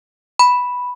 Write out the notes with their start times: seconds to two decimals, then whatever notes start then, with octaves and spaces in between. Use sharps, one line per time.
0.39 B5